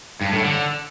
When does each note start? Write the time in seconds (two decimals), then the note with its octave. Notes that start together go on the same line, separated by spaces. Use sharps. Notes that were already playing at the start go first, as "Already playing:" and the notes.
0.21 G2
0.32 A2
0.44 D3